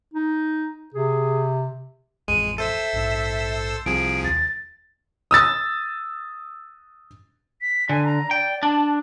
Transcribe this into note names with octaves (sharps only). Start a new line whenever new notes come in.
D#4
C3 G#4
A1 F2 E3 G#3 D#7
A4 C5 E5 E6
A#1 G#2
C2 F3 G#4 D7
D#2 A6
D#6 E6 A6
B6
D3 G#5
A#5
D5 G5
D4 A5